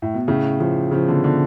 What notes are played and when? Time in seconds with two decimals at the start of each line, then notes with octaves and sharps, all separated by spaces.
0.02 A2
0.14 B2
0.28 A2 C#3
0.59 C#3 F3
0.91 C#3 F3
1.08 B2 D3
1.24 B2 D3